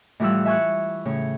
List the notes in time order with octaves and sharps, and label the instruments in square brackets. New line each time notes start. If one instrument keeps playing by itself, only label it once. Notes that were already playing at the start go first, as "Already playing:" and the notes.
[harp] A2 E3 F3 G3 F#5 E6
E5 G#5 C#6 F#6
A2 C#3 C#5